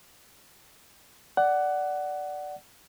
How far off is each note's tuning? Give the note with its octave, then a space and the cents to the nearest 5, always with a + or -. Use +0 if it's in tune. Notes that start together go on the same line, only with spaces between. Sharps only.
D5 +0 F#5 +15